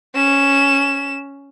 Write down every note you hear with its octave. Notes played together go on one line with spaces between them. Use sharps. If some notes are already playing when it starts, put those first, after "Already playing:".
C#4 E7